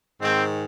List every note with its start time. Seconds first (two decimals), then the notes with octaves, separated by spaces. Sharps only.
0.20 G#2 D#3 C4